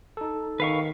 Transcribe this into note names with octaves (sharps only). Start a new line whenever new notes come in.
D#4 A4
D#3 B4 F5 C#6